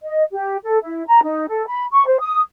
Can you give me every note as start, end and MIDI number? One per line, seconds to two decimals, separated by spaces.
0.03 0.23 75
0.32 0.56 67
0.64 0.78 69
0.82 1.03 64
1.07 1.19 82
1.23 1.46 63
1.48 1.65 69
1.66 1.85 83
1.92 2.05 85
2.06 2.19 72
2.19 2.40 87